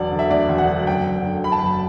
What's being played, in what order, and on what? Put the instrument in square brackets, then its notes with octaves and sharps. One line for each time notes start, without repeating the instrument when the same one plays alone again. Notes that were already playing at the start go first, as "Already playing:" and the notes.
Already playing: [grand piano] E1 F#3 D5
D3
E5
D2 D5
E1
F#5
F#3
F#1 G5
F#1
D3
F#2 B5
A5
F#1 B5